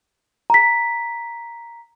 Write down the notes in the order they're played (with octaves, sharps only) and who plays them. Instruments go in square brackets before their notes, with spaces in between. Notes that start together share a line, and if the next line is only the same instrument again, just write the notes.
[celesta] A#5 B6